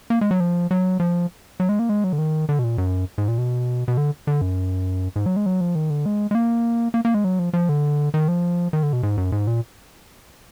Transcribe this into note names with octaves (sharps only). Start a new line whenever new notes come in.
A#3
G#3
F#3
F3
F#3
F3
F#3
G#3
A#3
G#3
F#3
D3
D#3
D3
B2
A#2
F#2
G#2
A#2
B2
B2
D3
D3
F#2
G#2
F#3
G#3
F#3
F3
D#3
D3
G#3
G#3
A#3
A#3
A#3
G#3
F#3
F3
F3
D3
D#3
F3
D#3
D3
B2
G#2
F#2
G#2
A#2